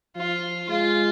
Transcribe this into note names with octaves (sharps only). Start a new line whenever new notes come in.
F3 F4
G#3 F4